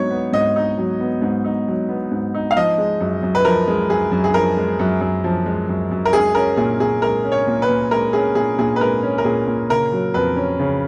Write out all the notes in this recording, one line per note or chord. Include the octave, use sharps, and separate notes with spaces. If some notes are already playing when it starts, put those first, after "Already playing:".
Already playing: G#2 F#3 B3 D#4 C#5
B3
G#2 D#5
D#4
F#3
B3
G#2
D#4
F#3
B3
G#2
D#4
F5
F3 D#5
G#3
F#2
F#2
B4
F3 A#4
G#3
F#2 G#4
F#2
G#4
F3 A#4
G#3
F#2
F#2
F3
G#3
F#2
F#2
A#4
G#3 G#4
C#4 A#4
A#2 G#4
A#2 G#4
G#3 A#4
C#4
C#5
A#2
B4
A#2
G#3 A#4
C#4 G#4
A#2 G#4
A#2 G#4
B4
G#3 A#4
C#4
A#4
A#2 G#4
A#2
C#3 A#4
F#3
F2 B4
C#4
C#3